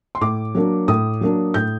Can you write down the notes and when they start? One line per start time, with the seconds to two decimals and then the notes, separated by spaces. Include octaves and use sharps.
0.15 C6
0.21 A2 D6
0.55 F#3 A#3 D4
0.88 A2 D#6
1.21 F#3 A#3 D4
1.54 A2 G6